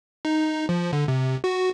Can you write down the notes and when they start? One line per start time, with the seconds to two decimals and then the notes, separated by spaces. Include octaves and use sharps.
0.25 D#4
0.69 F3
0.93 D3
1.08 C3
1.44 F#4